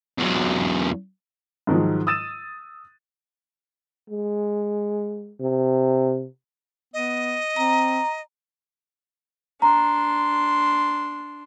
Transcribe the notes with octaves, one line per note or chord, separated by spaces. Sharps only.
E2 F#3
G#2 D#3 F3 F#3 G#3
D#6 E6 A6 D#7 E7
G#3
C3
B3 D#5
C4 A#5
D4 A#5 C6